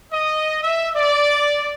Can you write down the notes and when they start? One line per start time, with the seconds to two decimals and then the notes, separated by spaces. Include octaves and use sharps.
0.11 D#5
0.62 E5
0.94 D5